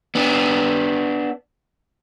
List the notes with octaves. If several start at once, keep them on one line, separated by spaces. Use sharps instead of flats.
B3 D4